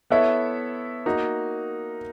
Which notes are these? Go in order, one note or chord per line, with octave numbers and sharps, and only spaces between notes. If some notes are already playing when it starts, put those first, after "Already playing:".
B3 E4 A4 C#5 E5
A#3 D#4 F#4